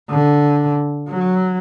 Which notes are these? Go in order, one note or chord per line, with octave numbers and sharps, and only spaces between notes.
D3
F#3